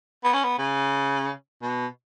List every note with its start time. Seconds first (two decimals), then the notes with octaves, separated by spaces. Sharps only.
0.24 B3
0.33 C#4
0.43 B3
0.59 C#3
1.62 B2